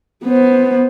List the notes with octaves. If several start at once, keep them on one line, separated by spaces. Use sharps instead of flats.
B3 C5